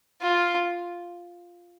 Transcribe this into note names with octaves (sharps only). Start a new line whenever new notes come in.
F4